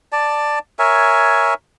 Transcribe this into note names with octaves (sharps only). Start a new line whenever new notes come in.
D5 A5
A#4 C#5 E5 G#5